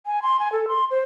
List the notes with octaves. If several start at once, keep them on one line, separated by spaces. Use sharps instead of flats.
G#5
C6
G#5
A4
C6
C5